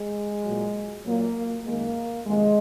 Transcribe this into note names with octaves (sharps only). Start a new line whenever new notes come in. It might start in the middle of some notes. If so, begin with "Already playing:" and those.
Already playing: G#3
A#2 F#3
A#2 F#3 A#3
F#2 D#3 G#3 A#3
F2 C3 D#3 G#3